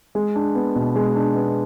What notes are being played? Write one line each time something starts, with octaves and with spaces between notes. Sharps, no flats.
G#3
D4
B3
B2
G#3
D4
B3